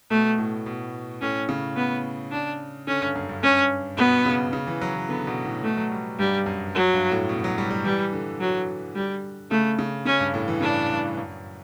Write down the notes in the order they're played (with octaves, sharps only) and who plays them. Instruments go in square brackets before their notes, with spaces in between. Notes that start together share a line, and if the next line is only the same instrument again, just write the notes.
[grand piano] B2 [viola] A3
[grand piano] A2
B2
[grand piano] A2 [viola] C#4
[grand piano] C#3
[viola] B3
D4
[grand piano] D3 [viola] C#4
[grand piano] G2
F#2
G2
[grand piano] G2 [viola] C#4
[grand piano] B2 [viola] B3
[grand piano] C#3
C#3
E3
F#3
E3
[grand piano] D3 [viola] B3
[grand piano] B2
A2
[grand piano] B2 [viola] A3
[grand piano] F#3
G3
[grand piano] G2 [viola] G3
[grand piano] F#2
[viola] F#3
[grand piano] G2
A2
B2
F#3
G3
G3
[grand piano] E3 [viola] G3
[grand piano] D3
[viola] F#3
G3
[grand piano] C#3 [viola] A3
[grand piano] C#3
[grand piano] C#3 [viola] C#4
[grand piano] G2
A2
E3
[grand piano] C#3 [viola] D4
[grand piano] G2
F#2